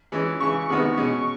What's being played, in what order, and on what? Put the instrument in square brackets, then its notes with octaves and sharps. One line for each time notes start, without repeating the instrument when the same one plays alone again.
[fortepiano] E3 G#3 C#4
[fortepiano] C#3 E3 G#3 [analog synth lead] C#6
[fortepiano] C3 D#3 G#3 B3
B2 G#3 C#4